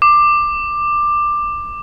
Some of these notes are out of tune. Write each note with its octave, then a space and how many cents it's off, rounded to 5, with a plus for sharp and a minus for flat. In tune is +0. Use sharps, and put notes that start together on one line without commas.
D6 +15